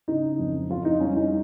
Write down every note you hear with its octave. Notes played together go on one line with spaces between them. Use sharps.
C#3 D#4
F2
F2 F4
D#4
G3 C#4
D#4